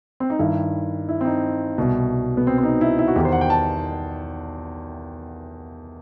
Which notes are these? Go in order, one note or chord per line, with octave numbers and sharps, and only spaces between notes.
C4
D#4
G2 D#3 E4
E4
C4
D#4
C2 B2
B3
C4
C4
D#4
E4
E4
F#4
E2 D#3 G4
C5
F#5
G5
A5